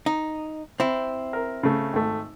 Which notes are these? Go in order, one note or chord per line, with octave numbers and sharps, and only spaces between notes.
D#4
C4 E4
A#4
C#3 A3
G#1 A3